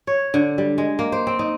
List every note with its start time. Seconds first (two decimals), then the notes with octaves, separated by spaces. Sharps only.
0.07 C#5
0.34 D3
0.58 G3
0.78 G#3
0.99 A#3
1.12 C5
1.27 C4
1.39 D#4